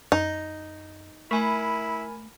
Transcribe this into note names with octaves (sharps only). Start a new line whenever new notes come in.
F#2 D#4
A3 E4 A#4 G#5 B5